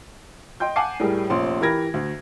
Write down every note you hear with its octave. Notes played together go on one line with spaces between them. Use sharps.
D#5 G5 C6 G6
F#5 G#5 A5 D6 C7
A2 G3 G#4 A#4
F1 A#1 C#4 C6
E3 G4 A#4 B5 G#6 A#6
D2